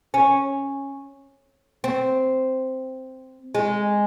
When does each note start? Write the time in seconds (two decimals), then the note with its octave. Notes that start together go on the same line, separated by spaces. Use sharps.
0.14 C#4
1.84 C4
3.55 G#3